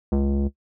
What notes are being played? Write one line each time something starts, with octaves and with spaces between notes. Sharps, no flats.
C#2